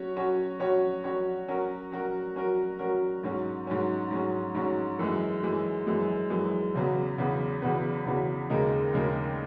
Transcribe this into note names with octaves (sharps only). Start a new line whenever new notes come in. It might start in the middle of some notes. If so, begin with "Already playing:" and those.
Already playing: F#3 C#4 F#4 C#5
F#3 C#4 F#4 C#5
F#3 C#4 F#4 C#5
F#3 C#4 F#4 C#5
F#3 C#4 F#4 A#4
F#3 C#4 F#4 A#4
F#3 C#4 F#4 A#4
F#3 C#4 F#4 A#4
G#2 F#3 C#4
G#2 F#3 C#4
G#2 F#3 C#4
G#2 F#3 C#4
F#2 E3 G#3
F#2 E3 G#3
F#2 E3 G#3
F#2 E3 G#3
E2 C#3 F#3 B3
E2 C#3 F#3 B3
E2 C#3 F#3 B3
E2 C#3 F#3 B3
D#2 C#3 G#3 D#4 A#4
D#2 C#3 G#3 D#4 A#4